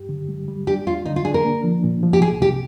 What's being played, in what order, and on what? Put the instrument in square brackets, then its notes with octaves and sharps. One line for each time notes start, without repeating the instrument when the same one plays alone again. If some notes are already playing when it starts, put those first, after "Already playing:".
Already playing: [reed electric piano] G2 G4
D3
G3
G3
[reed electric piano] D4 [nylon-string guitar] G4
[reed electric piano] D#2 [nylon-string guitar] F4
[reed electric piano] D3 [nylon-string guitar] D#4
[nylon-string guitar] F4
[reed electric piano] D4 [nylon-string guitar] G#4
[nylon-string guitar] A#4
[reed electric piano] A#3
F3
A#2
F3
[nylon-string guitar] G4
[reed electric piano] C2 [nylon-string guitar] G#4
[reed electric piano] C3 [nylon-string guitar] G4